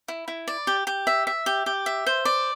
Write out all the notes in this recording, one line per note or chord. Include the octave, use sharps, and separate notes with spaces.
E4
E4
D5
G4
G4
E5
E5
G4
G4
E5
C5
D5